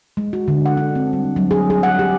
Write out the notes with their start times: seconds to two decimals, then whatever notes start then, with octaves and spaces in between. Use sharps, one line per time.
0.17 G#3
0.33 F#4
0.48 D3
0.66 F#5
0.77 D4
0.95 C4
1.13 G3
1.36 F#3
1.51 G#4
1.70 G#4
1.83 F#5
1.99 G4